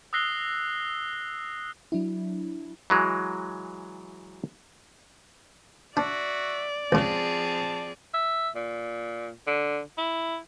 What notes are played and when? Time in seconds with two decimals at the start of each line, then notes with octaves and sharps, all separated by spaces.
0.13 D#6 E6 F#6 A#6 C7 G7
1.92 F#3 D4 E4
2.90 E3 F#3 G#3
5.97 D4 F#4 D5 E5
6.92 C#2 C#3 F3 C4 G#4 A5
8.14 E5
8.55 A#2
9.47 D3
9.98 E4